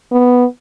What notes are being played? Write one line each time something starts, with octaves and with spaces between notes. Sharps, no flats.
B3